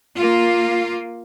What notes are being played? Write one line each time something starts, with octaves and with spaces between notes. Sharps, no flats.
A#3 F4